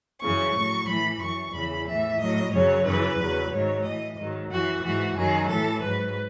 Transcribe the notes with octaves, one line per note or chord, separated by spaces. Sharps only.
F#2 C#3 E3 C#6
A2 F#3
A2 E3 B5
F#2 E3 C#6
E2 C#3 E3 B5
A2 E3 E5
A2 F#3 D#5
F#2 C#3 F#3 C#5
F#2 C#3 E3 B4
E2 C#3 F#3
G#2 D#3 F#3 C#5
A2 E3 D#5
G#2 D#3 F#3
F#2 E3 F#4
G#2 E3 F#4
F#2 D#3 F#3 G#4
A2 E3 A4
G#2 F#3 B4